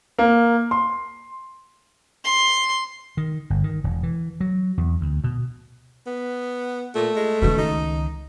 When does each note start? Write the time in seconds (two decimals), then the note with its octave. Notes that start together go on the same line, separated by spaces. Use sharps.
0.18 A#3
0.71 C6
2.24 C6
3.17 D#3
3.50 G1
3.64 D#3
3.84 E1
4.03 E3
4.41 F#3
4.78 E2
5.01 D2
5.24 B2
6.07 B3
6.95 A#2 A3
7.16 G#3
7.42 C#2 B2 D#3
7.58 D#4